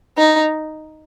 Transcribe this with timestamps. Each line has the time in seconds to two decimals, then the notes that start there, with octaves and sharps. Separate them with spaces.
0.18 D#4